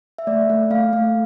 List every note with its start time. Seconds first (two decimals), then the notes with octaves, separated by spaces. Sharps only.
0.18 E5
0.27 A3 D5
0.50 A3
0.71 A3 F5
0.93 A3